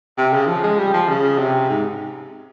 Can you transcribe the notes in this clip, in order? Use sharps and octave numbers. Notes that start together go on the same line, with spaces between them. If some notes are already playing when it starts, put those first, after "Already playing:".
C3
C#3
F3
G#3
G3
F3
C#3
C3
G#2